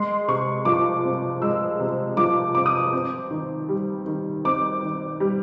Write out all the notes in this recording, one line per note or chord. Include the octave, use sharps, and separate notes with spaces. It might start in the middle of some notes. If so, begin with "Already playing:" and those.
Already playing: G#3 C6
C3 C#6
F3 D6
C4
G#3 E6
C3
F3 D6
C4 D6
D#6
D6
C4
D#3
G3
D#3
C4 D6
D#3
G3